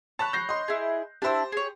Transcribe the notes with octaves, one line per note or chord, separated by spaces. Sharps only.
C#5 A5 B5 F#6
G6 A#6 C7
D#5 C6
E4 G#4
D4 E4 G4 C5 E6
G#4 C#5